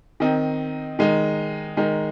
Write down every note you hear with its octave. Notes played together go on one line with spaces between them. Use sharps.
D#3 C4 D#4
D#3 G#3 D#4
D#3 G#3 D#4